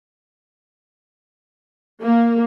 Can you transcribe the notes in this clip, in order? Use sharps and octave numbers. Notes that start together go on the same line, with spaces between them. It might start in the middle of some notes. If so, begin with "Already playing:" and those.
A#3